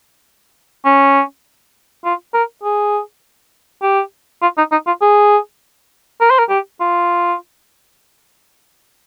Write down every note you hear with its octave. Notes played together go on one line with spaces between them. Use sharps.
C#4
F4
A#4
G#4
G4
F4
D#4
D#4
F4
G#4
A#4
C5
A#4
G4
F4